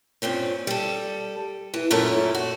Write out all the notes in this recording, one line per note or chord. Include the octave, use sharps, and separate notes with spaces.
G2 A#2 C4 C#4
G3 A4
E3
F#2 A#2 A3 C#4 A4 A#4
F#4